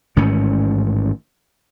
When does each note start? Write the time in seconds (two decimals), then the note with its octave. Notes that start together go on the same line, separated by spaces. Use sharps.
0.16 A1 G#2 D#3 C#4